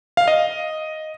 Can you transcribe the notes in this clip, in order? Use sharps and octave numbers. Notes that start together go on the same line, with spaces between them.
F5
D#5